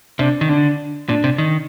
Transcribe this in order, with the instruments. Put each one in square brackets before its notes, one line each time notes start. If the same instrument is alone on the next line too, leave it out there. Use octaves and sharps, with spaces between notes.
[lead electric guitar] C3 [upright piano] D4
[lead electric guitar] D#3
[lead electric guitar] D3 [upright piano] D4
[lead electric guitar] A#2 [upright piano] D4
[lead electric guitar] C3
D#3